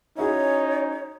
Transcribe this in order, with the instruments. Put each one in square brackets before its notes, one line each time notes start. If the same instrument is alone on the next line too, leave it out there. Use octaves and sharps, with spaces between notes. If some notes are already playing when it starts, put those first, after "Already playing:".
[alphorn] C#4 [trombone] D#4 [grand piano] E4 F#4 G#4 [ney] C#5